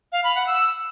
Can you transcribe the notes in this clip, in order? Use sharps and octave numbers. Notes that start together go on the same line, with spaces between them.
F5
B5
F#5
E6